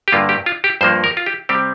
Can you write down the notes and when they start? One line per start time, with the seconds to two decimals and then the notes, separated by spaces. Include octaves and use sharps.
0.08 G4
0.12 G2 D3 A#3 F4
0.29 G4
0.46 F4
0.64 G4
0.81 G2 F3 A#3 C5
1.04 A#4
1.17 F4
1.26 G4
1.49 C3 G3 C4 G4